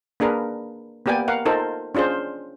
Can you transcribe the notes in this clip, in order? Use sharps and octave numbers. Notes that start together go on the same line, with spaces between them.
A#3 D4 G#4 A#4 B4
A#3 B3 G4 D5 G5 G#5
A#4 F5 F#5
D#4 F4 A4 A#4 C5
C#4 D4 F4 G#4 C5